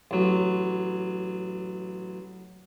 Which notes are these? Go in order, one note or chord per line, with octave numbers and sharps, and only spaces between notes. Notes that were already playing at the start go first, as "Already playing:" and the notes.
A1 F#3